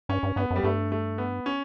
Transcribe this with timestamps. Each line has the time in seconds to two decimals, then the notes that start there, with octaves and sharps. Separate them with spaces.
0.09 G2 C#4
0.23 G2
0.36 G2 B3
0.51 F#2
0.56 G3
0.64 G2 A3
0.92 A3
1.18 B3
1.46 C#4